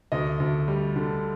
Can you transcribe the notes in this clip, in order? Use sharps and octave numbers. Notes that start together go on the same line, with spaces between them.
D2 D#5
D2
G3
D3